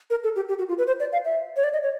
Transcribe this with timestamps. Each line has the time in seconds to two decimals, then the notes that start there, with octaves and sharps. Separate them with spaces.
0.10 A#4
0.24 A4
0.36 G4
0.49 G4
0.59 F#4
0.68 F4
0.78 B4
0.87 C5
1.00 D5
1.12 F5
1.25 E5
1.57 C#5
1.64 D5
1.73 D#5
1.83 C#5